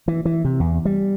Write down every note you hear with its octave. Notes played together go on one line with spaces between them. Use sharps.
E3
E3
C3
E2
G3